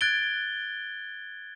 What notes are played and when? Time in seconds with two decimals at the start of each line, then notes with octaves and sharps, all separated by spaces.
0.01 F#6 G#6 A6 D7 G7